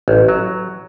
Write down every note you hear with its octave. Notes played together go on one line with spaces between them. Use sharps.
A1
F#3